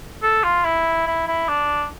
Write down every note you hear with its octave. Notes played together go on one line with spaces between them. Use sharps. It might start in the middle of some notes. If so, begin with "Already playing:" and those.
A4
F4
E4
E4
E4
D4